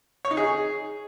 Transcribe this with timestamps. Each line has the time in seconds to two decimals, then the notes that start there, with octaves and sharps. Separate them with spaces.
0.25 C#5
0.31 D#4
0.37 G#4